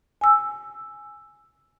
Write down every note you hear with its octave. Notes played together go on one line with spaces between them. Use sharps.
G#5 E6